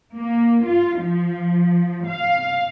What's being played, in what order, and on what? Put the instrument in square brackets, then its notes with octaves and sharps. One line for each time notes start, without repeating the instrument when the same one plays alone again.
[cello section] A#3
F4
F3
F5